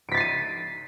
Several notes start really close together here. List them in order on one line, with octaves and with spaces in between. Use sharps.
D7 B6 A6 C7 D#7